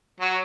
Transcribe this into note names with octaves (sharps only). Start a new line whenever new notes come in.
F#3 F#4